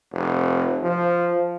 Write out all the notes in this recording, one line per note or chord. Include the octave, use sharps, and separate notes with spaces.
F1
F3